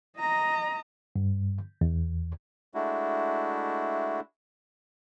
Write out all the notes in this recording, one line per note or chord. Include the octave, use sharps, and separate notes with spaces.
D#5 A#5
G2
E2
G#3 A3 D4 E4 F#4